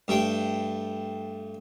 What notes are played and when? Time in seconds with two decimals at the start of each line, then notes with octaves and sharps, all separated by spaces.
0.08 G2 A3 G5